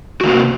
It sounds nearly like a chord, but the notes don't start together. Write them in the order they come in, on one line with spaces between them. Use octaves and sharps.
F#4 D#3 A#3 C3